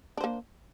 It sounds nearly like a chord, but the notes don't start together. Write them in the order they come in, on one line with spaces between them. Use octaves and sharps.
D4 C5 A#3